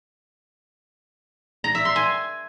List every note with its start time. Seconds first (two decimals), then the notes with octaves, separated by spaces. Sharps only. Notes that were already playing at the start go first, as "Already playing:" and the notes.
1.64 A#5
1.75 E5
1.85 C6
1.96 G#5